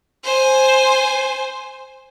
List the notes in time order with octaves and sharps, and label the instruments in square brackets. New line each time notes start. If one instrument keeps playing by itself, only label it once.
[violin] C5 G#5